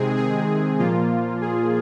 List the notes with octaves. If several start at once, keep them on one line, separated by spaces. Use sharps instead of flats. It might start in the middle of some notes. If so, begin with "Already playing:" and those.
Already playing: C3 D#3 G#3 C4 G#4
G#4
A#2 F3 A#3 F4
G#4